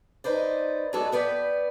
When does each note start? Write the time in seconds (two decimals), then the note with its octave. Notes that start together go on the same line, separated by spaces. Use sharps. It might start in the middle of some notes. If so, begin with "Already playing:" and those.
0.24 D#4 B4 C5 D5
0.93 F#3 G#3 B3 A4 D5
1.12 B3 B4 D5 G5